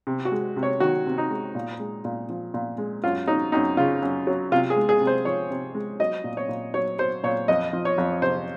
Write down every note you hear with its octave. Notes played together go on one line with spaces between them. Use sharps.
C3
F#4
G#3
C3
C#5
D#3 F#4
C3
D#4
G#3
A#2
G#3
A#2
F3
A#2
G#3
F#2 F4
F#3 D#4
F#2 D#4
C#3 F4
F#2
F#3
C3 F4
G#4
G#3
G#4
C3
C5
F3 C#5
C3
G#3
F#3 D#5
A#2
C#5
A#2
F#3 C#5
F#3 C5
A#2 C#5
F2 D#5
F3
C#5
F2
C3 C5